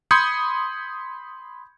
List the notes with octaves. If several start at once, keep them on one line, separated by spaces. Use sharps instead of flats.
B5 C6 D#6 G6 G#6 C#7